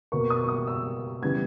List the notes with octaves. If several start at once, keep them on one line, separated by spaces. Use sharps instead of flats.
B2 A#3 C#6
D#6
C#6
D#6
E6
C#3 E3 G3 B3 G#6